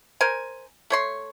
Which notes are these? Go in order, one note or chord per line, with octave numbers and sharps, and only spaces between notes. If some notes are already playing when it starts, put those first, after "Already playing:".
A#4 C5 G#5
A3 C#5 C6